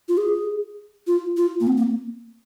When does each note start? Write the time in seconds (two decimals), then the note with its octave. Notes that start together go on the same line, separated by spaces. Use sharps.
0.09 F4
0.18 G#4
1.07 F4
1.37 F4
1.60 A#3
1.67 C4
1.77 A#3